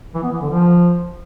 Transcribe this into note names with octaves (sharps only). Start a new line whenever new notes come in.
E3
B3
E3
D3
F3